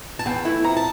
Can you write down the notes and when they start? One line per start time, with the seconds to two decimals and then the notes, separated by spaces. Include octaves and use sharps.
0.19 A5
0.26 E2 G5
0.45 E3 A3 E4
0.64 F2 A#5
0.76 A5